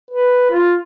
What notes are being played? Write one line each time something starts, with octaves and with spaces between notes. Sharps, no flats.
B4
F4